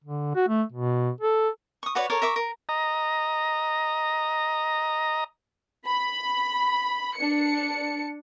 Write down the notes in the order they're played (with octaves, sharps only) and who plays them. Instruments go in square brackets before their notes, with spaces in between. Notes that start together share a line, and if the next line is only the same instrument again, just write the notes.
[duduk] D3
F#4
A3
B2
A4
[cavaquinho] C#6 D#6
F#4 B4 C#5 D5
A4 A#4 C#5 D6
A#4 E5 C#6 D6
A#4
[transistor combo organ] D#5 A#5
[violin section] B5
D4 C#7